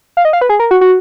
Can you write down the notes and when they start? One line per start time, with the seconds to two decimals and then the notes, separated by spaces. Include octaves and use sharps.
0.17 F5
0.25 D#5
0.33 F5
0.41 B4
0.49 G#4
0.60 A#4
0.71 F#4
0.81 F#4